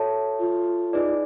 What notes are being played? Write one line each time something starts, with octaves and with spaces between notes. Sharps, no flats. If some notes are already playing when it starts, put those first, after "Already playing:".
Already playing: F#4 A4 C#5 E5 A5
F4
D#4 G#4 B4 D5